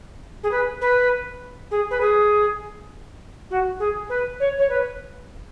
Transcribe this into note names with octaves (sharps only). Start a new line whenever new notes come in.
G#4
B4
B4
G#4
B4
G#4
F#4
G#4
B4
C#5
C#5
B4